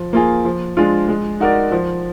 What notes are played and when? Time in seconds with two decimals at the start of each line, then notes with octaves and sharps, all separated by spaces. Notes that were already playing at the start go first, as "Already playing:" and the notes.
Already playing: F3
0.13 A#3 F4 G#4
0.45 F3
0.77 G#3 D4 F4
1.08 G#3
1.40 D#4 F#4 A#4 D5
1.72 F3